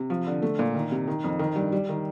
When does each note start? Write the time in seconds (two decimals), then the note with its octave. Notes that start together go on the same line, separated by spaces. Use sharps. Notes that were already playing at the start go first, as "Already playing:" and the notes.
Already playing: C3
0.10 F3
0.27 D3
0.42 A3
0.59 A#2
0.74 D#3
0.92 C3
1.08 D#3
1.24 F2
1.39 D#3
1.56 G2
1.72 G3
1.89 D#3